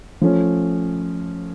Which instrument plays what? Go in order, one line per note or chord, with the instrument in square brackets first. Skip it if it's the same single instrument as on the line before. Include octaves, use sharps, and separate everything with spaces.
[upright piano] F3 A3 C#4